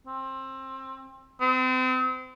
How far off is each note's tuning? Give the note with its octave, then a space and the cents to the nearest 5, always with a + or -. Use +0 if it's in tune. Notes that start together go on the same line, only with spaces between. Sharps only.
C4 +25
C4 -35